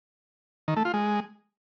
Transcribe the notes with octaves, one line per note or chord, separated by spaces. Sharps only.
D#3
A3
F4
G#3